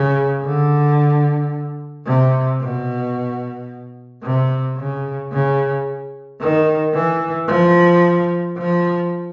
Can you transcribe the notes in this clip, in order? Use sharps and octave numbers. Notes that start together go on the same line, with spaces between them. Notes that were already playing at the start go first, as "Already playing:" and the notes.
Already playing: C#3
D3
C3
B2
C3
C#3
C#3
D#3
E3
F3
F3